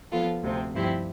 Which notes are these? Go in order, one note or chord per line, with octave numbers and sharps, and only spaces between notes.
F3 B3 F4 A4
D2 C3 F3 C4
G2 F3 C4 E4 G4